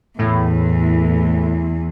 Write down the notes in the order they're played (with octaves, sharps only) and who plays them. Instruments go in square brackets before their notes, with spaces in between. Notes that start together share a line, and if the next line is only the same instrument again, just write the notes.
[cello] E2 [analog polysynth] A2